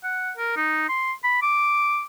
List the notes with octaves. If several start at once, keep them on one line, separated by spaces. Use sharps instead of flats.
F#5
A#4
D#4
C6
B5
D6